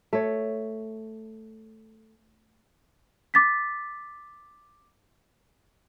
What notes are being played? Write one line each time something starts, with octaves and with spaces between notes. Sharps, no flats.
A3 C#5
D6 A6 B6